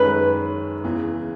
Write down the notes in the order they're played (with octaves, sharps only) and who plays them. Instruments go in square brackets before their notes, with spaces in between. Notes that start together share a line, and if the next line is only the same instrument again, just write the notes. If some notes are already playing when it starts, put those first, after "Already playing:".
Already playing: [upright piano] F#2 D#3 G#3 C#4 [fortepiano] B4
[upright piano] E2 C#3 E3